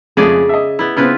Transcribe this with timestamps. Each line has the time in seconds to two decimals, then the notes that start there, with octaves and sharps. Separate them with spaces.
0.17 F2 C#3 G#3 A3 G#4 D5
0.49 D#5 E5
0.79 B3 E4
0.96 C#3 B3 C4 E4 F4 B4